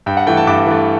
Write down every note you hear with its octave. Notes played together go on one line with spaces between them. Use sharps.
G2 G5
F#5
E3 A3 G5
A5
G2 D6
E3 A3